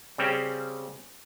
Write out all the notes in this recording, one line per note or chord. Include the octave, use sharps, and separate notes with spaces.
C#3 G3 C4 C#4